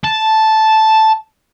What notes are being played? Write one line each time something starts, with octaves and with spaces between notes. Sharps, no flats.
A5